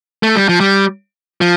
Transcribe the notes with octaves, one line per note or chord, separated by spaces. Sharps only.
A3
G3
F3
G3
F3